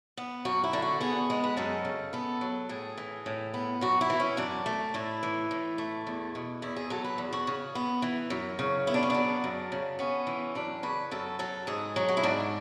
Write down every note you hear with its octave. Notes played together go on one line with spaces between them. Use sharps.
B3
F#2 F#4
E4
D3
F#4
B3 G#4
G#3
B4
F#2 A4
C#3
B3 A4
F#3
A2 G#4
E3
A2
B3
F#2 F#4
E4
E3
C#4
F#2 D4
A3
A2 E4
E3
A2
A3
E2
B2
E2 E4
G#4
F#3 A4
B4
E2
F#4
C#3
B3
E3
F#2
C#3
B3 E4
D4
C#4
F#3 D4
F#2
C#3
B3 C#4
E3
F#2 D4
C#3 B4
F#2 A4
F#3 A4
G#2 G#4
F#3
F#4
E4
G#2 D4